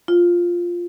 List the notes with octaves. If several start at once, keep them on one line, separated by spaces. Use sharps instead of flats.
F4